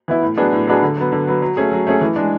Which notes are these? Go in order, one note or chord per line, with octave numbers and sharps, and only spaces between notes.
E3 B3 E4
A2
F#3 B3 D4 G#4
A2
F#3 B3 D4 G#4
D3
F#3 B3
D3
F#3 B3
F#3
A3 C#4 G#4
F#3
A3 C#4 G#4
E3
G#3 D4